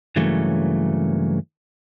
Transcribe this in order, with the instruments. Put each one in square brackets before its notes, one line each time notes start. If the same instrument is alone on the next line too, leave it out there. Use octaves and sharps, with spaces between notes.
[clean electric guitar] G2 C#3 E3 F#3 A3 A#3